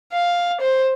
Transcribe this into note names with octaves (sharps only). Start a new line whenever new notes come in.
F5
C5